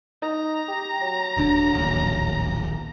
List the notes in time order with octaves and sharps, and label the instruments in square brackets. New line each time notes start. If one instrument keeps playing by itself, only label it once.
[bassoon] D#4 [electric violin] A#5
[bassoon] G4
F#3
[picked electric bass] D#1 D3 D4
D1 A#1 D#2